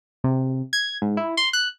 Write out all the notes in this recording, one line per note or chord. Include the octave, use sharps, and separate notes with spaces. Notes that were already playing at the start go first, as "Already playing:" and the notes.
C3
G#6
G#2
E4
C6
F#6